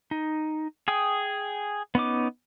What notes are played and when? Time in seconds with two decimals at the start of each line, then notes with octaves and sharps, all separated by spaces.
0.11 D#4
0.88 G#4 G5 D#6
1.95 B3 C#4 D#4 D6